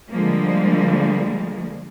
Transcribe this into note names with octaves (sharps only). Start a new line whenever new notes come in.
D3 F3 G3 G#3 A#3